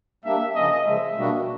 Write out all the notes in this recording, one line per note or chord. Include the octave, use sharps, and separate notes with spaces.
G3 A#3 D4 E5
C#3 F3 A#3 C#4 D#5
C#3 F3 G#3 E5
B2 G3 A#3 D4 F#4